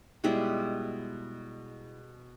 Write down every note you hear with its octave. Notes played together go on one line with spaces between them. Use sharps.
B2 G3 G#3 E4